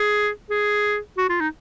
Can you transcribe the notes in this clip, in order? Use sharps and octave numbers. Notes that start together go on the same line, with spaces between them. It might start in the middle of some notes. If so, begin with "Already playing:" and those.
Already playing: G#4
G#4
F#4
F4
D#4